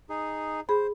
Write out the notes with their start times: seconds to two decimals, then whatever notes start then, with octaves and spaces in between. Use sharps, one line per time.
0.10 D#4 G#4
0.69 G#4 C5 B5